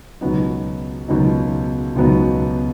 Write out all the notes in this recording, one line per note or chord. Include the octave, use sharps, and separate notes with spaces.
C#2 B2 F#3 B3 D#4
C#2 B2 F#3 B3 D#4
C#2 B2 F#3 B3 D#4